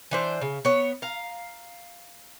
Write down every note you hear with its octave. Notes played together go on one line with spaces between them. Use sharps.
E3 D4 C5
C#3
B3 C#5
F5 A#5